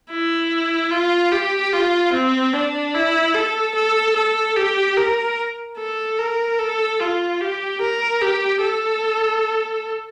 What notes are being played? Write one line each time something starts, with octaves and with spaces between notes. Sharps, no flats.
E4
F4
G4
F4
C4
D4
E4
A4
A4
A4
G4
A#4
A4
A#4
A4
F4
G4
A#4
G4
A4